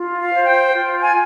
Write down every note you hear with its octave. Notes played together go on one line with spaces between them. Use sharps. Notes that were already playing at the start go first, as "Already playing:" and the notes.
Already playing: F4
F5
C5
G5
F4
G#5